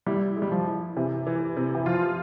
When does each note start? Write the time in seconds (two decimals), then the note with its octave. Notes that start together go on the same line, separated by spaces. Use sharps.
0.07 G3 E4
0.37 G#3
0.42 G3
0.51 F3
0.67 E4
0.96 C3 E3
1.26 E3
1.57 C3
1.75 E3
1.86 F3 F4